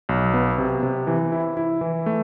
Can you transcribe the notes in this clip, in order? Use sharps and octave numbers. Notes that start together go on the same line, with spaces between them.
B1
B3
C3
C3
E3
E4
E4
E3
A3